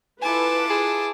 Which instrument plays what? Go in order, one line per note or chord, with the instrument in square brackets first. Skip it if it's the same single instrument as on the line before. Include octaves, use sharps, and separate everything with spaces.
[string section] E4 F4 A4 [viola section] B4 [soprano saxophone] G#5 [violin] A5 D6
[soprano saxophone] G#4